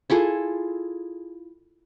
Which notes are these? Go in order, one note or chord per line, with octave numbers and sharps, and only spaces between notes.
E4 F4 G#4 A4